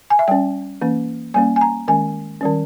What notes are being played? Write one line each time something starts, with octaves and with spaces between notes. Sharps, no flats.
G#5
E5
G3 C#4 G5
E3 A#3 C#4
G3 A#3 C#4 G#5
G#5
A#5
D#3 G#3 C#4 G#5
D#3 G3 C#4